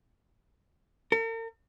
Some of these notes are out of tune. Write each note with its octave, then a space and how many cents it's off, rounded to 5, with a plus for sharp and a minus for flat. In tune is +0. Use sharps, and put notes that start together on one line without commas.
A#4 -45